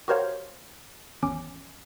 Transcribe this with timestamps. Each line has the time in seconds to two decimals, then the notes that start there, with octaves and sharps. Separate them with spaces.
0.08 F#4 G4 A#4 C5 C#5 F5
1.23 G#1 E2 C#4 D6